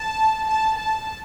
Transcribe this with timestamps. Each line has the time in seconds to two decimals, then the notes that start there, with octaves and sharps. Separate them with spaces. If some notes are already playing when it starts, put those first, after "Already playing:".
Already playing: A5
0.48 A5
0.78 A5